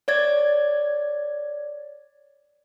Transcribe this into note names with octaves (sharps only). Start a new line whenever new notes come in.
C#5 D5 G#6 A6